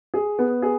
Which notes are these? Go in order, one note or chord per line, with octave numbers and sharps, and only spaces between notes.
G#4
B3
G#4